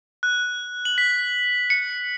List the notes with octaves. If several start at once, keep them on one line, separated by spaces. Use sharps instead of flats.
F#6
F#7
B6
C#7